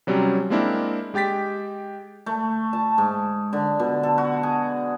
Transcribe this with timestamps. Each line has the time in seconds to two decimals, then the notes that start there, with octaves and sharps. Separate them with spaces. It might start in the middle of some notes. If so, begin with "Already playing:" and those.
0.07 C3 F#3 G3 C4 C#4
0.50 G#3 A#3 C4 D4 E4 A#4
1.14 G#3 G4 G5 A6 B6
2.26 A3
2.73 A5
2.98 G#2
3.53 D3
3.79 B2
4.03 A4
4.18 F#4
4.43 G#4